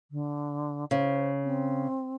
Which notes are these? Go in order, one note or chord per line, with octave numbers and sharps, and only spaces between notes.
D3
C#3 C5
C4